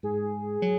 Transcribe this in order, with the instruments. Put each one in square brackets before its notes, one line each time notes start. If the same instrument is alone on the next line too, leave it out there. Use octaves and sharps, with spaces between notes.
[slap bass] G#2 [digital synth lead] G#4
[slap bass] F#3